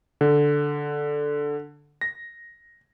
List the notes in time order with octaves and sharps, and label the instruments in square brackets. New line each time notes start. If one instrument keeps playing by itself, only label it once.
[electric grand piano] D3
A#6